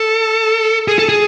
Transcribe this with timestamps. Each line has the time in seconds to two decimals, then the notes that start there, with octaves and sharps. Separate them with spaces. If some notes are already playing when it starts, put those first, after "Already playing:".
Already playing: A4
0.88 G#4
0.99 A4
1.09 G#4